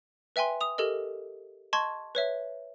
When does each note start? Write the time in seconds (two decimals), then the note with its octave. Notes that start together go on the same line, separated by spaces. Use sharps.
0.36 B4 E5 G5 G#5 C6
0.61 D#6 F7
0.78 G4 A4 A#4 D#5
1.73 D#5 A5 C6 C#6 G#6
2.15 B4 C#5 E5